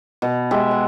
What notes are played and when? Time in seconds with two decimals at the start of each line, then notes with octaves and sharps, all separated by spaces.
0.22 B2
0.51 G#3 G4 E5
0.71 F#5